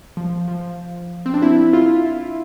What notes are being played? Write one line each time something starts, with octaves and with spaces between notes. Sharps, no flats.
F3
F3
C4
D4
E4
F4
E4